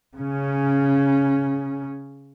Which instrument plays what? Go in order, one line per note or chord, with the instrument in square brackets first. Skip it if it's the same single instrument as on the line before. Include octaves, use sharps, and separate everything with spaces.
[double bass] C#3 C#4